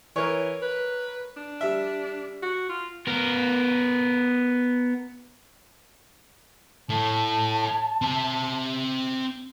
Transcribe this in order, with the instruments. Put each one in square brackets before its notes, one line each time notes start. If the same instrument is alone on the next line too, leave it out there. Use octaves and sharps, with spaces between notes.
[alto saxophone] E3 [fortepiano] A#4 C#5
[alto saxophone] B4
D4
[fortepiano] G3 E5
[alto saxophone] F#4
F4
[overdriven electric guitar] B3 A#4
[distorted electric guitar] A2 [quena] A5
[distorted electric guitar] C4 E5